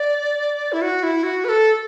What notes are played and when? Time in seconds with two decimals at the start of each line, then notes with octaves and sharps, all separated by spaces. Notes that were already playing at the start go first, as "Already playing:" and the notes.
Already playing: D5
0.73 E4
0.82 F#4
1.03 E4
1.23 F#4
1.45 B4
1.49 A4